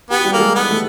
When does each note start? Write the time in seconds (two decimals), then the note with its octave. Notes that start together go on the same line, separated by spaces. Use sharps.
0.10 B3 G4
0.18 F#4
0.24 G3 G4
0.33 A#3 A4
0.40 G#3 G#4
0.55 B3
0.70 A3 A4